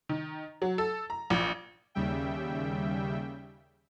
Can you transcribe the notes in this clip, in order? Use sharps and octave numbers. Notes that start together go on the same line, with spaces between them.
D#3
F#3
A4
A#5
A#1
D#2 C#3 G3 E5 G5